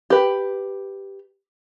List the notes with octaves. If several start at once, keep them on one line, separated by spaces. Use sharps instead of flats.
G4 B4